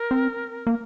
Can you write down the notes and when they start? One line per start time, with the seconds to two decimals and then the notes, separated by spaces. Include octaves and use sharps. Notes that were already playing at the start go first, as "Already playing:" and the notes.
Already playing: A#4
0.11 C4
0.67 A#3